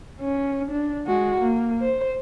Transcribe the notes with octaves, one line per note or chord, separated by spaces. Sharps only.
C#4
D4
G#3 F#4
A#3
C5